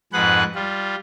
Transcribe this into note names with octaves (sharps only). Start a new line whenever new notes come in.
F2 G#2 G#4 B4 F#5 F#6
G3 F4